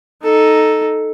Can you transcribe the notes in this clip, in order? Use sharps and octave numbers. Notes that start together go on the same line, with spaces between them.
D#4 A4